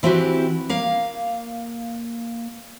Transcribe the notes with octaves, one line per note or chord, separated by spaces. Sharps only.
E3 C4 E4 F#4 G4
A#3 F5